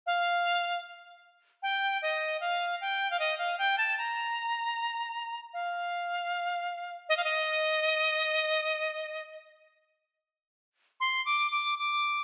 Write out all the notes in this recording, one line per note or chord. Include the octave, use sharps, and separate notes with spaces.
F5
G5
D#5
F5
G5
F5
D#5
F5
G5
A5
A#5
F5
D#5
F5
D#5
C6
D6
D6
D6